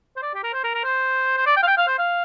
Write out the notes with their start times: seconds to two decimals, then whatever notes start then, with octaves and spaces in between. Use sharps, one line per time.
0.16 C5
0.22 D5
0.35 G4
0.43 A#4
0.53 C5
0.64 A#4
0.74 A#4
0.84 C5
1.37 C5
1.46 D5
1.56 G5
1.63 F5
1.67 G5
1.77 F5
1.88 C5
1.98 F5